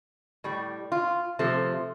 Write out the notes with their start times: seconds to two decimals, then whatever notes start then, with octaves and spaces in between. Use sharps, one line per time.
0.44 A2 G3
0.92 F4
1.39 C3 F3 A3